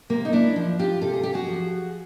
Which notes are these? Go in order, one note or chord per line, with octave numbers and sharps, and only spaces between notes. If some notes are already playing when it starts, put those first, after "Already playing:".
C3 A#3
D#4
D4 E4
F3
F4 G4
C3 A4
G#4
G4
F#4 G#4
F3